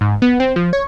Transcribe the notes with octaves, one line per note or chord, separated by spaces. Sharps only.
G#2
B3
C4
F3
C#5